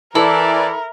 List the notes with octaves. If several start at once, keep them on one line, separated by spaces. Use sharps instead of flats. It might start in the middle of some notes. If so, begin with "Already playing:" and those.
E3 E4 A4 A#4 D5